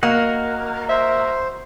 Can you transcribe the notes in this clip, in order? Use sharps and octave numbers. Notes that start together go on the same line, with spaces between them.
A#3 F#4 D#5 F#5
C5 E5